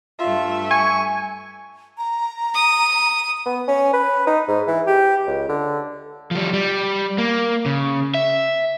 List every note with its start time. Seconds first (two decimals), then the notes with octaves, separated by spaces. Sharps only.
0.20 G2 A3 F4 E5
0.71 G#5 C#6
1.98 A#5
2.54 D#6
3.46 B3
3.68 C#4
3.93 B4
4.27 D#4
4.48 G#2
4.67 E3
4.87 G4
5.27 C#2
5.49 D3
6.31 F3 G3
6.53 G3
7.18 A#3
7.66 C#3
8.14 E5